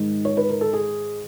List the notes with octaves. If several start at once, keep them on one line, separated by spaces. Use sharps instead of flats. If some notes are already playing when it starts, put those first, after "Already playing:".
Already playing: G#2 D#3 G#3
C#5
B4
A#4
A4
G#4